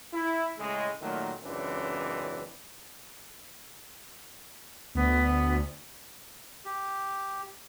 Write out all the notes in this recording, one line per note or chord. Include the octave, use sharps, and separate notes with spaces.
E4
A2 C#3 G#3
A#2 D#3 F#3 A3
C#2 F#2 E3 C4 D4
D2 B3
G4